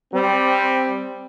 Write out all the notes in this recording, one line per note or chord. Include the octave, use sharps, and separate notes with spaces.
G3 C4